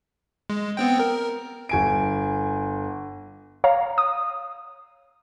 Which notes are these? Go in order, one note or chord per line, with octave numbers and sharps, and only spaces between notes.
G#3
B3 C4 G5
A#4
G1 G#5 D7
C#5 F5 A#5
D#6